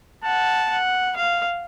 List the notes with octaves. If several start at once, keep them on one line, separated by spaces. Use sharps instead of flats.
F#5 A5
F#5
F5